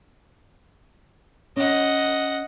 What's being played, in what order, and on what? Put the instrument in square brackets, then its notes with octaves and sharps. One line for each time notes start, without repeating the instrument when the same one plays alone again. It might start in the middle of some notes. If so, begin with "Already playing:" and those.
[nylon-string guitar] C#4 [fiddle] D#5 F#5